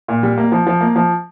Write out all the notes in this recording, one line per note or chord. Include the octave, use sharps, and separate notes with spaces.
A#2
G3
A#3
F3
F3
A#3
F3